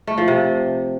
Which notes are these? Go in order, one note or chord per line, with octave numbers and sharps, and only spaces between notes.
A3
F3
C3